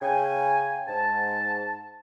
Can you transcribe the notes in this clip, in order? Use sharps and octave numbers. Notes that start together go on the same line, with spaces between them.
C#3 G5 G#5
G#2 A5